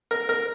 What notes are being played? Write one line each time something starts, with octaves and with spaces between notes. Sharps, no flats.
A#4
A#4